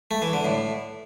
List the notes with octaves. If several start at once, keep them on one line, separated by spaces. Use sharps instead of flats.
A3
E3
D3
A2